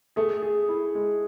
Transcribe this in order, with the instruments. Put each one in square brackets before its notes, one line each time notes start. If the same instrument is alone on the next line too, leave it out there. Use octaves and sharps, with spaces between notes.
[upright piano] A3 [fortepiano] G#4
[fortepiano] G#4
E4
G#3